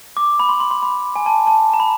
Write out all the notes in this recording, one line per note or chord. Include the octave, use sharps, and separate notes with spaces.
D6
B5
C6
C6
C6
B5
G#5
A5
A5
A#5
B5